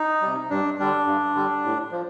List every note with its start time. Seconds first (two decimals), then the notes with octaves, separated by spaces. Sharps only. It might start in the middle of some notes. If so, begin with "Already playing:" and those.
Already playing: D#4
0.22 C3 G3
0.50 G2 D4
0.79 D3 G3 D4
1.07 G2
1.35 D3 G3
1.64 A2
1.92 F3